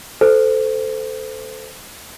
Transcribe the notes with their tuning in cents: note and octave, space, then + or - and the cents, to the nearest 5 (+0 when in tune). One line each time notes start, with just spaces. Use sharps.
A4 +0 C5 -25